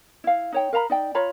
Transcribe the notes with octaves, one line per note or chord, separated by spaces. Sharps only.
E4 F5
D#4 C#5 G5
A#4 F5 A#5 B5
D#4 D5 G5
F4 C#5 A#5 B5